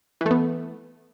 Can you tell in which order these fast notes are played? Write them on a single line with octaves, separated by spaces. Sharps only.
E3 A3 B3